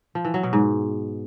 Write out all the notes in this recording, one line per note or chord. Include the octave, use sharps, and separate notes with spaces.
F3
E3
F#3
B2
G#2